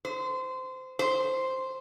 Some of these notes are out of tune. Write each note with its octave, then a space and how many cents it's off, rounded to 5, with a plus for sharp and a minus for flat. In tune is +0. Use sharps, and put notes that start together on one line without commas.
C5 -20
C5 +0